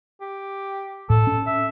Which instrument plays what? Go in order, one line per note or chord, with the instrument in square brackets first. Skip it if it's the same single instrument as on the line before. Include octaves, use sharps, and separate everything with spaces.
[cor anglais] G4
[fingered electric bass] A2 [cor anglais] A4
[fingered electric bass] C#4
[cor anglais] E5